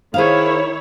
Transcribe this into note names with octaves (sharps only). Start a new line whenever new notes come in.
D#3 E4 G#4 C5 C#5 F5